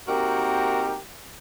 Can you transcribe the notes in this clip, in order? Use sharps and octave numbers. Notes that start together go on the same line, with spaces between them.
A#3 C4 D#4 F#4 G4 A#4